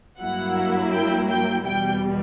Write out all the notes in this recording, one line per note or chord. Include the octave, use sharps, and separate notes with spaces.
G2 F#3 A#3 E4 F#5
G5
G5
E2 B2 G3 G5